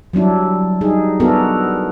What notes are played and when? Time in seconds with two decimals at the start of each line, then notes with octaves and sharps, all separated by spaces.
0.13 F#3 G3 D4 E4
0.81 G3 D#4 G#4
1.20 B3 D4 E4 F#4 A4 A#4